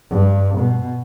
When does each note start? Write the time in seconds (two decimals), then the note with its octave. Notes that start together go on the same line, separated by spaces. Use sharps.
0.10 G2
0.59 B2